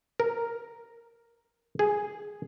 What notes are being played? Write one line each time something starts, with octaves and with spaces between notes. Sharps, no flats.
A#4
G#4